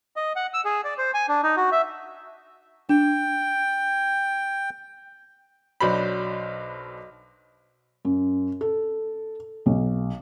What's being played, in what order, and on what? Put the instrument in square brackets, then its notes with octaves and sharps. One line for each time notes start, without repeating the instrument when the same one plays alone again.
[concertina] D#5
F#5
E6
G#4
D5
C5
G#5
D4
D#4
F#4
E5
[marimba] D4 [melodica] G5
[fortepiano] B1 F#3 D4 C5 B5
[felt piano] F#2
A4
B1